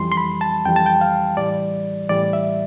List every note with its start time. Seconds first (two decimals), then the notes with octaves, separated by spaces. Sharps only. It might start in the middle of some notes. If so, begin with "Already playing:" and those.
Already playing: F2 E3 G3 C6
0.12 C6
0.17 B5
0.41 A5
0.65 F2 E3 G3 G5
0.76 A5
0.86 G5
1.01 F5
1.37 A2 E3 G3 D5
2.09 A2 E3 G3 D5
2.33 E5